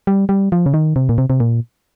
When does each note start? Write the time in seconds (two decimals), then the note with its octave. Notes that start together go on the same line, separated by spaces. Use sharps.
0.07 G3
0.29 G3
0.52 F3
0.66 C#3
0.74 D#3
0.96 C3
1.09 A#2
1.18 C3
1.30 C3
1.40 A#2